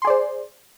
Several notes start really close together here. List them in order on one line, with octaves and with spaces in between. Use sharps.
C6 G#4 D5 C5